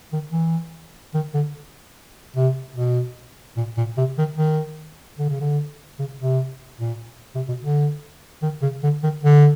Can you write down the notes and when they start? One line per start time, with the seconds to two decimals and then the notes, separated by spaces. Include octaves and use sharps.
0.13 D#3
0.32 E3
1.14 D#3
1.34 D3
2.36 C3
2.76 B2
3.57 A#2
3.77 A#2
3.97 C3
4.18 D#3
4.37 D#3
5.19 D3
5.30 C#3
5.40 D3
5.99 C#3
6.20 C3
6.80 A#2
7.35 C3
7.48 B2
7.62 D3
8.42 D#3
8.62 C#3
8.83 D3
9.03 D#3
9.23 D3